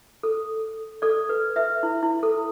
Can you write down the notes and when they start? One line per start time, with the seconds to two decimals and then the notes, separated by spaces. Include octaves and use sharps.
0.23 A4
1.02 A4 D5
1.29 B4
1.56 B4 E5
1.83 E4
2.03 E4
2.23 A4